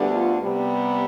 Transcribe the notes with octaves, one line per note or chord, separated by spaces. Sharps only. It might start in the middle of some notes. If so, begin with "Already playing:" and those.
Already playing: D2 D3 G3 B3 D4
F4
C3 G3 B3